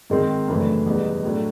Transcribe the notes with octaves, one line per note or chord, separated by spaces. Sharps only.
G#2 D#3 G#3 C4
F#2 C#3 E3 A3 D4
E2 B2 G3 B3 D#4
A2 F#3 A3 D4